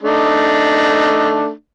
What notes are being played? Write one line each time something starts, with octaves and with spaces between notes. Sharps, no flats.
A3 D4 D#4